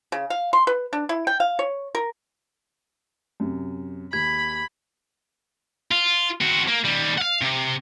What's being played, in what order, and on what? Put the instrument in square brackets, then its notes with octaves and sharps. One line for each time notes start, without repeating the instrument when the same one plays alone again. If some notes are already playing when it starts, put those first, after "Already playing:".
[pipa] C#3
F5
C6
B4
D4
E4
G5
F5
C#5
A#4
[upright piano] F#2 C3
[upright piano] D#2 [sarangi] B5 [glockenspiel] G#6
[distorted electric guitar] F4
C4 F#4
A#3
D#2 G3
F5 F#5
C3